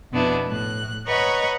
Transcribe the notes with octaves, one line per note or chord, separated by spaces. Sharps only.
F2 B2 B3 D4 E4
A2 F#6
B4 C#5 D#5 F#5 A#5 C#6